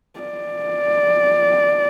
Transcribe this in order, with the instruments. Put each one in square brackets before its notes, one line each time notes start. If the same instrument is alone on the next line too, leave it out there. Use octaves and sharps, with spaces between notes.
[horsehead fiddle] D5